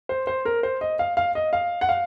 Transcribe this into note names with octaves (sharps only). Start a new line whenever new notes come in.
C5
C5
A#4
C5
D#5
F5
F5
D#5
F5
F#5
F5